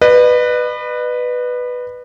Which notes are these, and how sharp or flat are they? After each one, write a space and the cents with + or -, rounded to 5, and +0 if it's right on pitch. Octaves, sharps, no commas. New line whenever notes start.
B4 +0 D#5 -45